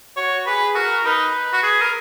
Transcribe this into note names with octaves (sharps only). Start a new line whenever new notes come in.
F#4 C#5
G#4 B4
F#4 A#4
D#4 B4
F#4
G#4
A#4